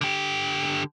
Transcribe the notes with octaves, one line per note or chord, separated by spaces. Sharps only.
D3 G4